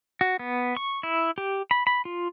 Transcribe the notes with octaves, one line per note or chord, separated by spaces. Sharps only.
F#4
B3
C#6
E4
G4
B5
B5
F4